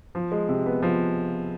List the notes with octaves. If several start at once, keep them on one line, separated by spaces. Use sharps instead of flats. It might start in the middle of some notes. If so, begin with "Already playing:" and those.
F3
G#3
C3
B3
F3